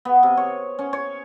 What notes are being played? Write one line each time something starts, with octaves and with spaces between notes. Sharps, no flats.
B3
C3
C#5
C#4
C#5